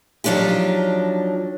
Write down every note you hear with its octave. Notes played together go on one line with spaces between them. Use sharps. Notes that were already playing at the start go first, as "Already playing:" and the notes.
F3 F#3 D4 D#4 G4